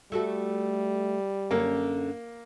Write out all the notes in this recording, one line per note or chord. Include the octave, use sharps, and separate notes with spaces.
G3 A3 F#4 A4
F#2 D3 A#3 C#4